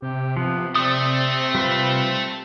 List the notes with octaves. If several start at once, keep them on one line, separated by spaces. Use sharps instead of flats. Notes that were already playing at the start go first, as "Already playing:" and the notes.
C3 G4
F3 B3
A3 C4 D5 D#6
G3 F4 B4